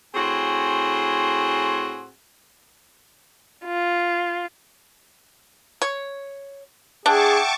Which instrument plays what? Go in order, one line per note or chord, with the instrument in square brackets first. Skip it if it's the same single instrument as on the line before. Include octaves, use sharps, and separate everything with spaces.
[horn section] A2 C4 F#4 G#4 G#5 C6
[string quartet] F4
[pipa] C#5
[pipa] D4 [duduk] G#4 [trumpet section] E5 F#5 G5 [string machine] A5 C#6 D6